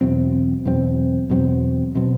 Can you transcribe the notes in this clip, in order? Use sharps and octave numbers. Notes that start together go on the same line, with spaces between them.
E2 B2 F#3 C4
E2 B2 F#3 C4
E2 B2 F#3 C4
B2 F#3 C4